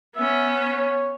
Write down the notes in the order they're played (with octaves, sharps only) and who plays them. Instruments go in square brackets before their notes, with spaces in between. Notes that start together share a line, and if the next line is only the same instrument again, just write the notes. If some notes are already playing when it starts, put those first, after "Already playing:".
[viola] B3 C#4 [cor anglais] E5
[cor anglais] C#5